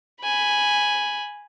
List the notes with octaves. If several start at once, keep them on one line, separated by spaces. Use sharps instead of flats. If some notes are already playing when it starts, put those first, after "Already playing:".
G#5 B5